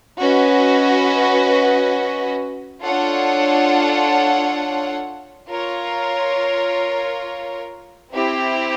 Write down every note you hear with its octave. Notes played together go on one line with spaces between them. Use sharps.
C#4 F#4 B4 D#5
D4 F4 A4 C#5 F#5
F4 A#4 C#5
C4 E4 G4